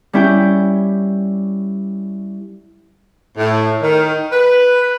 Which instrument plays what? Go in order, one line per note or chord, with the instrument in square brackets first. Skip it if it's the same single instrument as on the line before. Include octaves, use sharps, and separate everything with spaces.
[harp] G3 C#4 E4 G4 G5 G6
[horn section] A2
D#3
B4